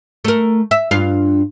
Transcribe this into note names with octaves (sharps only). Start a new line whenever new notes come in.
A3 A#4
E5
G2 F4 F5